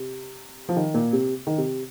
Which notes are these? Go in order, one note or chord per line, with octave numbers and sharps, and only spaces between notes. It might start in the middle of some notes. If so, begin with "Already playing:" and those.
Already playing: C3
F3
D#3
A#2
C3
D#3
C3